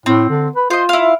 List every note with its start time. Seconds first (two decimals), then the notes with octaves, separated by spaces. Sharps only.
0.06 A2 C4
0.30 D3
0.56 B4
0.70 F4 C5 D#5
0.89 E4 F5